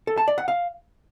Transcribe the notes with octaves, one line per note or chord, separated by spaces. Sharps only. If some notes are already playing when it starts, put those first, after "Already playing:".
A4
A5
D5
F#5
F5